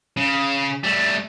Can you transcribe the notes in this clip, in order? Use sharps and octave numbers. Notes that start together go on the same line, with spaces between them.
C#3
G3 A3